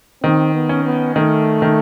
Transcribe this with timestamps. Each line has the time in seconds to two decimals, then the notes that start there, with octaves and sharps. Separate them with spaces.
0.23 D#3 C4
0.54 B3
0.69 C#4
0.85 B3
1.16 D#3 A3
1.62 D#3